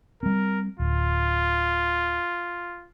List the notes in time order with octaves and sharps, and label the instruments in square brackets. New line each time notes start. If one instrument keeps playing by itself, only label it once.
[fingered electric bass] G3 C4 [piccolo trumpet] A#4
[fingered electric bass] D1 [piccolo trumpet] F4